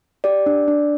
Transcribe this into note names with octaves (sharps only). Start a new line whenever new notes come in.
G4 D5
D4
D4